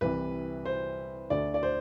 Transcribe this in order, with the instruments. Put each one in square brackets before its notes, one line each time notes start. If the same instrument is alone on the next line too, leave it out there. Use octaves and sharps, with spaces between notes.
[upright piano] C2 C3 E3 B4
C5
D2 D3 D5
D5
C5